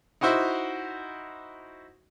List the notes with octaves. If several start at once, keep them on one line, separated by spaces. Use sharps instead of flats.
D#4 E4 F#4 C5 E5